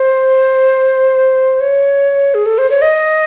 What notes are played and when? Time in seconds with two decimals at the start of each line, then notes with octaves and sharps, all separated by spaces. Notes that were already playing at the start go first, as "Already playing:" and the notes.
Already playing: C5
1.60 C#5
2.34 G#4
2.46 A4
2.58 C5
2.70 C#5
2.82 D#5